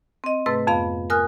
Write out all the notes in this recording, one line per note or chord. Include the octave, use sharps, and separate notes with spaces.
C4 D#5
G#2 C3 A3 B4 A6
F2 B3 F5 B5
A#4 G#5 D#6 F6 F#6